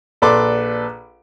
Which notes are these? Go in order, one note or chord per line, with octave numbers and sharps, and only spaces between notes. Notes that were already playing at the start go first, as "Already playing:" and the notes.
A#1 A4 B4 D5 C6 D6